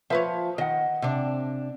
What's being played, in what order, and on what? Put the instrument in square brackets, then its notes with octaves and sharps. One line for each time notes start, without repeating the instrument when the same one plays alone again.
[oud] F3 B4 C#5 [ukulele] E5
[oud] D#3 [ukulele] D#5 F#5
[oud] C3 D4